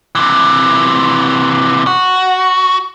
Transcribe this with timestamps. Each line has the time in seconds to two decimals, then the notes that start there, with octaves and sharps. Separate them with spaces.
0.15 C3 E3
1.87 F#4